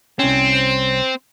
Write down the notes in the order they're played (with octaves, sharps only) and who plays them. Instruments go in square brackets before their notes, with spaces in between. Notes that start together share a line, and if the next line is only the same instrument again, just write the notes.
[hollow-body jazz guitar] C2 C#4 [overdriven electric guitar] C4